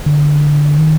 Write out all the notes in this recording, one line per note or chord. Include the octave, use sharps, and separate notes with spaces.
D3
D#3